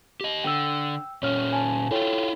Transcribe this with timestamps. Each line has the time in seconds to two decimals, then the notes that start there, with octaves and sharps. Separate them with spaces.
0.21 G4 D#5
0.44 D3 G5 E6
1.23 A#2 C#4 C#5 F6
1.53 G#5 A5
1.91 E4 F4 A4 C#5 G5